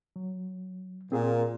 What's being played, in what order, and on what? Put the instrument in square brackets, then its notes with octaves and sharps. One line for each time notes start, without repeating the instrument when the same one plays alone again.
[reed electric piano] F#3
[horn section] A#2 [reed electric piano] C4 G#4